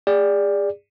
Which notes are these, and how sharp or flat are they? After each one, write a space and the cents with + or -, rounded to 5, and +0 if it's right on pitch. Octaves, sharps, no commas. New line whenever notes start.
G#4 -35 D5 +0